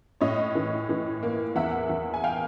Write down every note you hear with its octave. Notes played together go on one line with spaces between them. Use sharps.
A2 C#5 D#5
E3
E3
A#3
E2 E5 F#5
E2
G#5
F5 G5